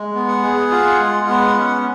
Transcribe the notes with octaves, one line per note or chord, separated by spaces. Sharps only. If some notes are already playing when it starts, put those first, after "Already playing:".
Already playing: G#3
B3
F#5
G#4
F4
G#3
B3
C#4